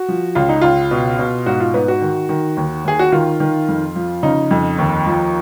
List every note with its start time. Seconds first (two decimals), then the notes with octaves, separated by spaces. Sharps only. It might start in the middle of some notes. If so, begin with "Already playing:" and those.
Already playing: F#4
0.08 F3
0.35 C#2 F4
0.49 D#4
0.61 C#2 F4
0.91 B2
1.19 B2
1.46 G#2 F#4
1.60 F4
1.74 G#2 B3
1.88 F#4
2.01 D#3
2.29 D#3
2.57 D#2
2.85 D#2 G#4
2.99 F#4
3.12 D#3 F4
3.40 D#3
3.68 F2
3.96 F3
4.23 C#3 D#4
4.51 F2
4.78 D#2
5.06 F3